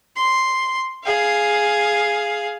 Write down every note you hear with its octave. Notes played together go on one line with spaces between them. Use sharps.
C6
G#4 F5